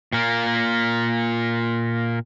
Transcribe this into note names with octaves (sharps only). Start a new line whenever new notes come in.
A#2 A#3